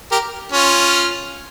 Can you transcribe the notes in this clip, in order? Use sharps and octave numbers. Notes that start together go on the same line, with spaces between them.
G4 A#4
C#4 F4